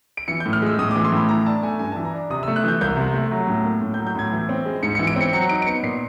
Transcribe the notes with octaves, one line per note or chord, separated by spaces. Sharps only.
D7
E3 C#7
G6
A2
F6
G#3 E6
A2 D#6
E3 D6
C6
A2 B5
E3 A#5
D4 A5
A3 G#5
G2 G#5
E3 A5
A#5
D4
C3 D#6
A3 E6
F#6
E3 G6
C2 G6
C3
A3
F#3
A2
A#3
A2
G6
F#3
G6
A2 G#6
E3
C4
G#3
G#2 C#7
E3 C#7
D7
C4 C#7
F#3 C#7
D#4 D7
D7
B3 C#7
A#2 C7